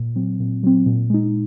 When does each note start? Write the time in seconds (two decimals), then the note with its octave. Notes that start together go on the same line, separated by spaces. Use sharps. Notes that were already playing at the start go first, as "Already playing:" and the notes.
Already playing: A#2
0.16 F#3 C4
0.40 A#2
0.63 F#3 C4
0.86 A#2
1.10 G#3 D#4